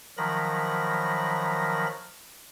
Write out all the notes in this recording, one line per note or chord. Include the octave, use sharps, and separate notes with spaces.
D#3 F3 F#3 A#4 B5 A#6